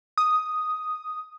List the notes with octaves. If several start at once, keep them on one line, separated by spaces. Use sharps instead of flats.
D#6